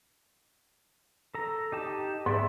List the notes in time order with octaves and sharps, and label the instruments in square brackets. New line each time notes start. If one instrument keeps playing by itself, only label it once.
[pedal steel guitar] A4 A#5
D#4 G4 A5
[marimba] G#2 [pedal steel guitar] B3 D5 E5